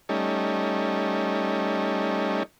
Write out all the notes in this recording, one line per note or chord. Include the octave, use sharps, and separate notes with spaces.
G3 A3 C#4 D#4